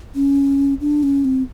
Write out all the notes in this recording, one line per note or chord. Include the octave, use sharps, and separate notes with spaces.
C#4
D4
C#4
C4